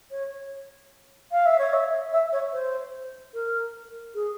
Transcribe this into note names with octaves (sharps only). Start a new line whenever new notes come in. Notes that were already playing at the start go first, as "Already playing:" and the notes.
C#5
F5
E5
C#5
E5
E5
C#5
C5
A#4
G#4